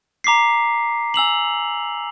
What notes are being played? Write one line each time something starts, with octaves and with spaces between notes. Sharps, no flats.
A#5 D6 B6 C7
G#5 E6 F7 F#7